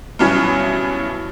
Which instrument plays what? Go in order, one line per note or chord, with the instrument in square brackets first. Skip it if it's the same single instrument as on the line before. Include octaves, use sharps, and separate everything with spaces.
[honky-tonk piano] G2 B2 E3 F#3 C#4